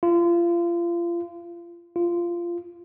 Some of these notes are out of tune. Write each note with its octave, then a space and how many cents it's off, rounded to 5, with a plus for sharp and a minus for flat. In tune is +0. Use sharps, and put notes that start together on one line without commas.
F4 -30
F4 -15